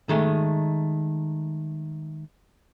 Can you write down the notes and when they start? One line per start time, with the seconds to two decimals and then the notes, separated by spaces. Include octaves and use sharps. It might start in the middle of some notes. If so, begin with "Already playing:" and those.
0.09 D#3 G#3 A3